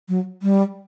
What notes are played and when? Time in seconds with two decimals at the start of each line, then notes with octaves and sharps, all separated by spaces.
0.09 F#3
0.42 G3